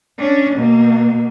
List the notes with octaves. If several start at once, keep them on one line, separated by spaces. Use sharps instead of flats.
C#4 D4
B2 A#3